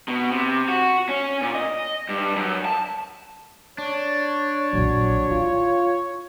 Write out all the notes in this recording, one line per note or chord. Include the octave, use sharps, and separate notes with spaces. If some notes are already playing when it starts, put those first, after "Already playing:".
B2
C3
F#4
C#4
A#2
D#5
G2
F#2
A5
D4 C#5
A#1 A#2 F#3
E4 F4